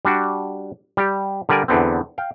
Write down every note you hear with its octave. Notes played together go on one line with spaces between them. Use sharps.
G3 D4 F#4
G3 G4
D3 G3 A#4 D5 G#5
E2 D3 B3 C4
F5 G5